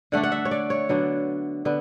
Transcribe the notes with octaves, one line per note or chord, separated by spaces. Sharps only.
D3 A3 D4 F#5
F#5
E5
C#5
D5
C#5
D3 F#3 B3 D4
D3 B3